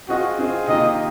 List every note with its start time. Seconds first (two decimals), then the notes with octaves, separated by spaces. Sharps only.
0.09 C4 F4 F#4 G#4 D#5
0.39 C4 F4 G#4 D#5
0.68 C3 D#3 A#3 F4 D#5